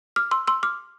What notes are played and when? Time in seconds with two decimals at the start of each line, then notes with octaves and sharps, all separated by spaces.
0.16 D6 F6
0.31 C6 E6
0.47 C6 E6
0.63 D6 F6